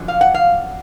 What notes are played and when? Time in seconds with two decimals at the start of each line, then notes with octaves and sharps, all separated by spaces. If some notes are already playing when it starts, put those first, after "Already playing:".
Already playing: F#2 D3 F3
0.08 F5
0.21 F#5
0.34 F5